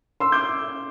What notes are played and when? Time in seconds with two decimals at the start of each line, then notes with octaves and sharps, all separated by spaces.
0.20 C6 E6
0.32 D6 G6